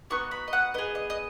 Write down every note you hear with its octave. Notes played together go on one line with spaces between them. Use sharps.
B3 D#4 F#4 C#6
B5
D#5
F#5
B3 G#4 D#5
D#5
D#5